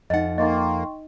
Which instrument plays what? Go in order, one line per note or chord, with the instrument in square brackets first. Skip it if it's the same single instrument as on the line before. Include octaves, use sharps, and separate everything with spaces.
[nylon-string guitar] F2 F#5 [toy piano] D#4 D#5
[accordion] A#3 [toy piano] D#4 D#5 [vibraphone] G5 C6 C#6